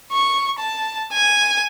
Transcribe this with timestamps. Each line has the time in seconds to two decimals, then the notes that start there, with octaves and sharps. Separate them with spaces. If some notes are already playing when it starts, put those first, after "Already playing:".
0.12 C#6
0.59 A5
1.13 G#5